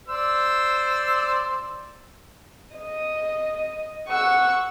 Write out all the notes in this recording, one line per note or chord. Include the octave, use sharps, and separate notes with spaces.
C5 D5 E6
D#5
F#5 C#6 E6